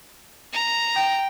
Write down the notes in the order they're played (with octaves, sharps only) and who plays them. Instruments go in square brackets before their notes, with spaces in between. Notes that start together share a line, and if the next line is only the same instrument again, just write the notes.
[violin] A#5
[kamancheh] G5